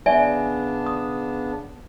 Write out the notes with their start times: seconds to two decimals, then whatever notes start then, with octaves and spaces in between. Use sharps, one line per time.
0.06 C#3 B3 D4 D5 E5 G#5
0.86 D#6